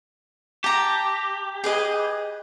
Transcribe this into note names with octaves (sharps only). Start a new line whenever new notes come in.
G4 A5 A#5
G#4 B4 D#5